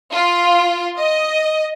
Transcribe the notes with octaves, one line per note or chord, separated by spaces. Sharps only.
F4
D#5